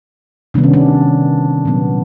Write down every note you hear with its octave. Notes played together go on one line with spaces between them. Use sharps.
C3 D#3 G3 B3 D4
C#4
D4
A#2 F#3 B3